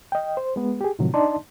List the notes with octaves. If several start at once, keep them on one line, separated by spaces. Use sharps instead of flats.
D#5 G5
C5
G#3 B3
G4 G#4
A2 C3 D#3 F3 F#3
D4 D#4 D5 D#5 A5 C6